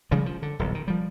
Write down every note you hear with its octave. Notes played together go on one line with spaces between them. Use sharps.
C#3 F3 G3 G#3
F3
D3
D#1 B1
D#3
F3 G3